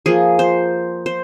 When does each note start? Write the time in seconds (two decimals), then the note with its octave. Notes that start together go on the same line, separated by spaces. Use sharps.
0.06 F3 A#3 G#4
0.39 C5
1.06 C5